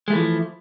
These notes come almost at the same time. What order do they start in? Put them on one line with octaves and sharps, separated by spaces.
G#3 A3 E3 F3